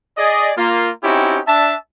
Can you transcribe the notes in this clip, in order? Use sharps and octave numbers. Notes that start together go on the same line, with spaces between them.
G#4 D5 D#5
A#3 F4
C4 C#4 D#4 E4 F#4 G4
D4 E5 A5